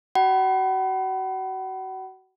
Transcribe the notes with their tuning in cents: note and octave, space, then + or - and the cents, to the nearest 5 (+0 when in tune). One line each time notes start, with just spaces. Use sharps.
F#4 +25 F#5 +40 B5 +0